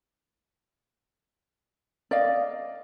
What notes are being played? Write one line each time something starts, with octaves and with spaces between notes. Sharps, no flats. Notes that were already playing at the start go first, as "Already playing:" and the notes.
D5 D#5 F5